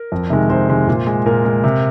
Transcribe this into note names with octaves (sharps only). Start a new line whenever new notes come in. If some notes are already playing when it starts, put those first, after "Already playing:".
Already playing: A#4
F2
C3 D#3 G#3
F2 C5
C3 D#3 G#3
A#2
G#3
A#2 A#4
G#3
C3